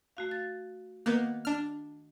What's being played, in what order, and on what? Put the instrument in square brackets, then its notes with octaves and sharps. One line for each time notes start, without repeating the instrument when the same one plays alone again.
[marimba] A3 F#4 F5
A6
[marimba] D#3 F#5 F#6 [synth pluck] A#3 B3
[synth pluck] D4 F6